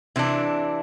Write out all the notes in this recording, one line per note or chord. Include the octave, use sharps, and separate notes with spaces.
C3 E3 D4